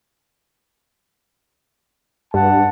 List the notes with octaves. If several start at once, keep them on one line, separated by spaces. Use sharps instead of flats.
G2 F#5 A5